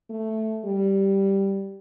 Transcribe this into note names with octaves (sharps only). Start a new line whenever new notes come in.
A3
G3